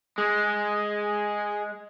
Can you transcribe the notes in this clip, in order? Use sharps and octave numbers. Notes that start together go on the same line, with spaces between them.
G#3 G#4